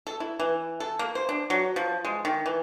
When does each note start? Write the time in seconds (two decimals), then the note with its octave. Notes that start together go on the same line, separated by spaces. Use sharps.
0.07 A4
0.20 E4
0.40 E3
0.80 A4
0.99 A#3
1.15 C5
1.29 D4
1.50 F#3
1.76 F3
2.05 G#3
2.25 D#3
2.46 E3